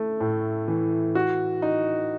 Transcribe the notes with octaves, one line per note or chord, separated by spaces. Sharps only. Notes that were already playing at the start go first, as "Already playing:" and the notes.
Already playing: A3 E4
A2
E3
F#4
D#4